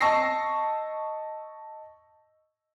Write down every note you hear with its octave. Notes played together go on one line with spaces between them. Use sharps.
D#5 A5 C#6 E6 A#6 C7